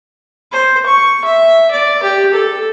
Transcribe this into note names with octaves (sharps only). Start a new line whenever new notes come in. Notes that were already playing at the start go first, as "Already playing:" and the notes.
C5
C#6
E5
D5
G4
A4